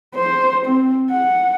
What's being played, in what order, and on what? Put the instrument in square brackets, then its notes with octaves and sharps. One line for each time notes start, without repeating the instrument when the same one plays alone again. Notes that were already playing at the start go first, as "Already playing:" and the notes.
[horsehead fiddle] C5
C4
F#5